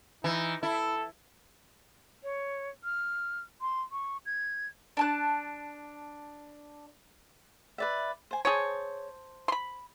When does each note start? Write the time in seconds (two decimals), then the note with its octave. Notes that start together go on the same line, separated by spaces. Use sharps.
0.24 E3 D#4
0.63 E4 A4
2.24 C#5
2.84 F6
3.61 C6
3.92 C#6
4.26 G#6
4.97 D4 A5 F#6
7.78 B4 D5 E5
8.31 C5 G#5
8.45 G#4 C5 C#5 A5 D#6
9.48 B5 C6